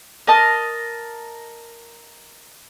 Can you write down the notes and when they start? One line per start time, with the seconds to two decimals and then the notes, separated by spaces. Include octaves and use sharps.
0.27 A#4 D#5 A5